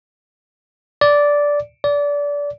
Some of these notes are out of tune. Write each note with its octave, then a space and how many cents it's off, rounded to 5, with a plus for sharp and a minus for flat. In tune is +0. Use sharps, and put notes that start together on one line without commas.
D5 -10
D5 -25